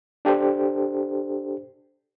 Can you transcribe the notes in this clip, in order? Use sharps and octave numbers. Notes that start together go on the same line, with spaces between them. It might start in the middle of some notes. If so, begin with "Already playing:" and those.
D4 G4 A4 C5